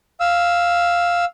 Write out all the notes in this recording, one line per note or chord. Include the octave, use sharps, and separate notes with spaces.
F5 E6